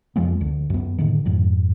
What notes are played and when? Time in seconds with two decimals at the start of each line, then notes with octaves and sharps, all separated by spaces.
0.16 F2 F3 G#3 B3
0.41 D2
0.70 F#2 B3
0.98 A2 D3 D#3
1.25 F2 G#2